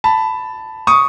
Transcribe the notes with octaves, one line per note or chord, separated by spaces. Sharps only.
A5 B5
C#6 D#6